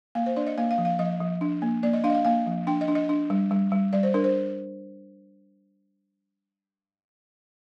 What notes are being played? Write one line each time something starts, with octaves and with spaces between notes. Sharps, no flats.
A#3 F5
C5
D4 D5
D#5
A#3 F5
F5
F3
F5
F3 D#5
F3
D4
A#3
A#3 D5
D#5
D4 F5
D#5
F5
A#3 F5
F3
D4 G5
D#5
D4
D#5
D4
G3
G3
G3
G3 D5
C5
D4 A#4
C5